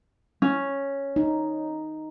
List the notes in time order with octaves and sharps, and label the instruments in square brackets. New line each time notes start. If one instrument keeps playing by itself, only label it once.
[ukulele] C#4
[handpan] D#4